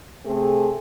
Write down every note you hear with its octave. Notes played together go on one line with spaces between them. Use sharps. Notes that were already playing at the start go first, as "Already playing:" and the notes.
C3 A3 C4 G#4 A4